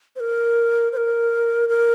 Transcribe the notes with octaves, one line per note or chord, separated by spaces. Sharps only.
C5
A#4
C5
A#4
A#4